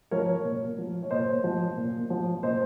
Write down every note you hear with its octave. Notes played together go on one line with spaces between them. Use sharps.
F3 A#4 C#5
A#2
F3
C#5
A#2 C5 D#5
F3
A#2
F3
A#2 C5 D#5